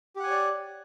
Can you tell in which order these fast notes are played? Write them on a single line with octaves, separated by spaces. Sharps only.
G4 F#5 G#5 C#5 D5